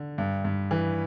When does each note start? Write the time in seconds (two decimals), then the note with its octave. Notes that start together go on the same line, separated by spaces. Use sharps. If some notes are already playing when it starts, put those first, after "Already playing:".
Already playing: D3
0.18 G2
0.45 G2
0.71 E3